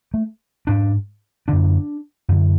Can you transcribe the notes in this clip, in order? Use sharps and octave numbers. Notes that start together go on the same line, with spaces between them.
A3
G#2 D4
F#2 D3 D4
F#2 D3